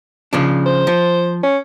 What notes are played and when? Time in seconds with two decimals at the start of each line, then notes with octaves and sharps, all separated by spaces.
0.33 C#3 F3 D4
0.66 C5
0.87 F3
1.43 C#4